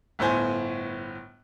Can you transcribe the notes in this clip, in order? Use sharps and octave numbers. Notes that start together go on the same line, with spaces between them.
G1 A2 B3 C5 G#5